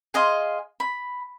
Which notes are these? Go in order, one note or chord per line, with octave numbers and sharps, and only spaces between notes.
G#4 D#5 F5 C6
B5